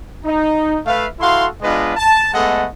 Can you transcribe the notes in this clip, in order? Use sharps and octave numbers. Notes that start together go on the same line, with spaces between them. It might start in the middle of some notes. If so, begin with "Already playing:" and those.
D#4
A3 B4 E5 F5
E4 F#4 A4 F5 C6
G#3 B3 D4 F4 B4 D#5
A5
G#3 A3 B3 A4 D#5 F#5